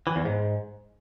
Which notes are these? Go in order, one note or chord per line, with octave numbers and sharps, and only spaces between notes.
E3
E2
G#2